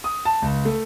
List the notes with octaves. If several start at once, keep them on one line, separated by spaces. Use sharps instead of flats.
D#6
A5
C#2
A3